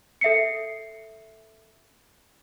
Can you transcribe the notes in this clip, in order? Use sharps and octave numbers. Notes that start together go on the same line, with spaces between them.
A4 E5 C7 C#7